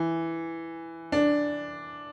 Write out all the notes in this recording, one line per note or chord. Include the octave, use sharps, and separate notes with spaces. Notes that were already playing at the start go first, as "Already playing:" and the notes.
Already playing: E3
D4